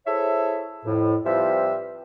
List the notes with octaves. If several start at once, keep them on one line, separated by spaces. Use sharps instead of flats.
E4 G#4 A4 C5 C#5 E5
F2 A2
F3 G3 C4 B4 E5